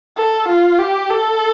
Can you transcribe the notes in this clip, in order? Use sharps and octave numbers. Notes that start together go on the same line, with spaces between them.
A4
F4
G4
A4